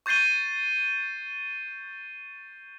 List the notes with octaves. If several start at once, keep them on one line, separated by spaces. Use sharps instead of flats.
C#6 G6 A6 C7 D#7 G7